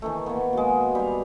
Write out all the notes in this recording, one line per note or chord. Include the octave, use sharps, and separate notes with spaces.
D#3 E3 A3
A#3 B3
G#3 F#4
G3 F5